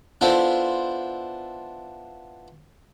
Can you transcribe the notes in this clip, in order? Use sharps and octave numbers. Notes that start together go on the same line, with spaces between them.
B3 D4 E4 F4 A4 C5